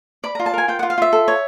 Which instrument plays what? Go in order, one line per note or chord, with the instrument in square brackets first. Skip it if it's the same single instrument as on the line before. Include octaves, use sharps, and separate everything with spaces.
[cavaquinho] D5 B5
F4 A#5
A5
A#4 G#5
F4 G5
F4 F#5
F5
F4 E5
A4
C#5